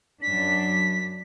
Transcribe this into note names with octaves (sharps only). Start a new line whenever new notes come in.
F#2 D4 B6